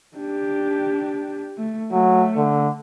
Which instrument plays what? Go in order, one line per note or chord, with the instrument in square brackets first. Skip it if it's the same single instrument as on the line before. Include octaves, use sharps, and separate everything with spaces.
[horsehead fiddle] D4 G4
A3
[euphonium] F#3 [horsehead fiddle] A3
[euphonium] D3